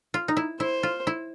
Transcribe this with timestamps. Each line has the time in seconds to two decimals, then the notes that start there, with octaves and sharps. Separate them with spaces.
0.14 F4
0.28 D#4
0.37 E4
0.60 E4 C5
0.83 F4
1.07 E4